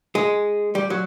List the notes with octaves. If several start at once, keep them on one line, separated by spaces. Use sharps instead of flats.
G#3
G3
F#3